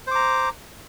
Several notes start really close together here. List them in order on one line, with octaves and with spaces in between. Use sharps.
C5 D6 A#5